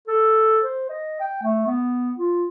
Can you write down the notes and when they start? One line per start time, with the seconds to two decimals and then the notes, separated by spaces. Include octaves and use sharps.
0.08 A4
0.63 C5
0.90 D#5
1.21 G5
1.43 A3
1.67 B3
2.18 F4